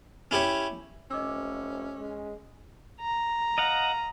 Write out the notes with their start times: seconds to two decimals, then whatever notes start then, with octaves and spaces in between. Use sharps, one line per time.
0.31 C#4 E4 G4 C#5
1.11 F1 C#4 D#5 D6 E6
1.99 G#3
3.01 A#5
3.58 D#5 F5 F#5